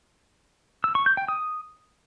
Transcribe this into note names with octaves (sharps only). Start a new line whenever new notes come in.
E6
C#6
G6
G5
D#6